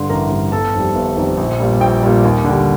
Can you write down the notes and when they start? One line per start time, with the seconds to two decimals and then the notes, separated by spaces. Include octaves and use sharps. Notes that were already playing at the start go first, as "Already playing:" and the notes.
Already playing: G2 D3 C6
0.10 A1 A#4 A#5
0.30 G2 D3
0.52 G1 A4 A5
0.74 F2 D#3 G3
0.95 G1
1.16 F2 D#3 G3
1.37 A#1
1.60 A#2 G3
1.80 A#1 G5
2.03 A#2 G3
2.24 D#2
2.44 D3 G3